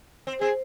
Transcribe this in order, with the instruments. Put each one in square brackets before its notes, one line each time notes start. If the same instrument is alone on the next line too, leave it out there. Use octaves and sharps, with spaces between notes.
[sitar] C4
[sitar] C4 [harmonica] G#4